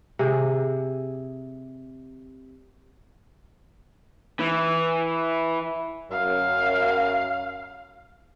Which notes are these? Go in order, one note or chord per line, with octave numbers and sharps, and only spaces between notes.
C3 G#4
E3
F#2 F5